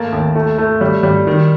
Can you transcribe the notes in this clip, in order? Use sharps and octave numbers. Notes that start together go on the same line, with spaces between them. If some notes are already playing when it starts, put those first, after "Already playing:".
Already playing: A3 A#3 A6
D#2
A3
A3
G3
G3
D#3